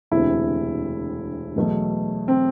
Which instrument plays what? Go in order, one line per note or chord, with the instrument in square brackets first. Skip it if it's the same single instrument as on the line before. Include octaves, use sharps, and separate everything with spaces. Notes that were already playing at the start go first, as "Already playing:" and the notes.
[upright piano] E1 D2 C3 E4
E2 B2 F#3 A3
C4